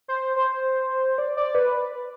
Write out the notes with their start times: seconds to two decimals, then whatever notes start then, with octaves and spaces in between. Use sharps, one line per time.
0.08 C5
0.36 C5
1.18 D5
1.37 D5
1.55 B4